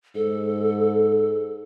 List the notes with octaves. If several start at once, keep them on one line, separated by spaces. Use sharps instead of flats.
G#2 A4